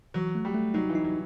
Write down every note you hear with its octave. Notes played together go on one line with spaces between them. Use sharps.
E3 F#3
A3
G3
A3
F#3 D#4
E3
D#4
F#3